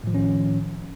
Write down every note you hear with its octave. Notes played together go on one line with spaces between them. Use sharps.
A2 D#3 F3 C#4